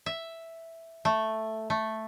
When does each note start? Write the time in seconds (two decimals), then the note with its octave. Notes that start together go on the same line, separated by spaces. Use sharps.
0.06 E5
1.05 A3
1.70 A3